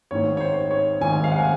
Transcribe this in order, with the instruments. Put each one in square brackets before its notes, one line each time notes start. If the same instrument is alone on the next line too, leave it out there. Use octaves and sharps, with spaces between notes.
[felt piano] G#1 G#2 D#3 [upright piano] C#5
[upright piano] C#5
C5
C#5
[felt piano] G#1 G#2 D#3 [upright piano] G#5
[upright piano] F5
F#5
G#5